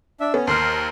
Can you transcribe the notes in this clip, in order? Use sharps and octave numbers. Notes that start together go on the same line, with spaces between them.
D4 E5
B3 C#4
D#2 A#4 C5 C6 F6